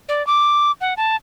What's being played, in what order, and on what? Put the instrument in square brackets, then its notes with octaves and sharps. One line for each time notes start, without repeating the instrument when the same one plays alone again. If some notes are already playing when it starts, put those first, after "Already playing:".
[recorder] D5
D6
F#5
A5